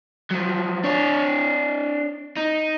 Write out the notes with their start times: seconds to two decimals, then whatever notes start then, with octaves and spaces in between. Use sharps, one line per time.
0.31 F3 F#3
0.84 D4 C#5
2.37 D#4